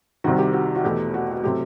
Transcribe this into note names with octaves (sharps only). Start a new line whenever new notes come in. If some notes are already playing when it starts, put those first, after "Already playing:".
C2 C3 D#3 F#4
G4
F#4
F#4
E2 B2 A3 G4
F#4
F#4
C3 F#3 A3 G4